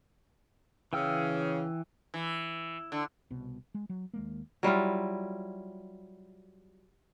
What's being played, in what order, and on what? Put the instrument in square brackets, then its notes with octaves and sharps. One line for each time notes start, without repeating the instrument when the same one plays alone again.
[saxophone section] C#3 [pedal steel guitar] E3 G5 E6
[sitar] E3
D3
[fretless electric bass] C2 B2
G#3
F#3
D#2 G#3 A#3
[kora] F#3 G3 E4 F4